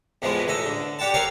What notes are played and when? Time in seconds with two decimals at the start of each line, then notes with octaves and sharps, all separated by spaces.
0.22 E2 A2 E3 F3 G#3 B3
0.47 A1 A3 A4 D#5
0.66 D3
0.99 G4 D5 F#5 G5 A5
1.14 A4 A#4 C#5 F5 G5 A5